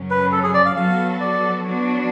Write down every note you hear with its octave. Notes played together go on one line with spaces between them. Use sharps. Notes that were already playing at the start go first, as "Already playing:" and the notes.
Already playing: F#2 C#3 F#3 C#4
B4
A4
G#4
D5
F5
F#3 B3 F#4 A4 F5
D5
F#3 B3 D4 F#4 C#5